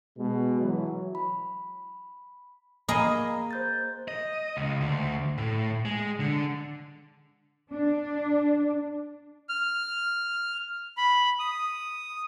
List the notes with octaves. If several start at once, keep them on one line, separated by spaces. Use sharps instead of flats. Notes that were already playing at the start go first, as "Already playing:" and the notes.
B2 G#3
E3 F#3
B5
A#3 G#4 D#5 A#5 B5
C5 G6 A6
D#5
C#2
D2
A2
G#3
D3
D4
F6
B5
D#6